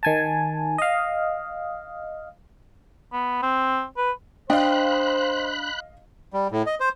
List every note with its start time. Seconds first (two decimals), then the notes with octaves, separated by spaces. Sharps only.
0.03 D#3 G#5 A5
0.78 D#5 F5
3.12 B3
3.43 C4
3.97 B4
4.50 D4 C5 D#5 F5 G5 B5 F#6
6.33 G3
6.52 A2
6.66 D#5
6.80 C5